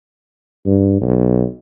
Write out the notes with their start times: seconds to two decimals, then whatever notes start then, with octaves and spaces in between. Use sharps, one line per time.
0.66 G2
1.01 B1